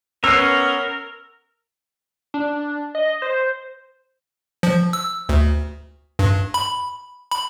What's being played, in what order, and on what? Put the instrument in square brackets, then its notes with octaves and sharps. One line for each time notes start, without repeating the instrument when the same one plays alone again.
[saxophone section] B3 C#4 [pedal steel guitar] A#4 [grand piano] E6 C7
[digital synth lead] D4
D#5
C5
[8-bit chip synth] F3
E6
D2
G2
B5
B5